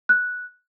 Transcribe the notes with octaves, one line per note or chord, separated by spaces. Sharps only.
F#6